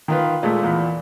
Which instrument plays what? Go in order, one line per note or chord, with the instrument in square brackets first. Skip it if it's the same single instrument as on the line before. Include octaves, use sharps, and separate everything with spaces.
[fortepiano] D#3 F4 B4
A#2 G#3 A3
E2 A#2